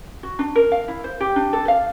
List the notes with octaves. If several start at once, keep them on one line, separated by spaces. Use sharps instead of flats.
F#4
D4
A#4
F5
E4
C5
G4
D4
A4
F5